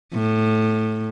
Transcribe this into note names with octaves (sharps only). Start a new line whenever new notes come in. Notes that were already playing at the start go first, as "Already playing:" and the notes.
A2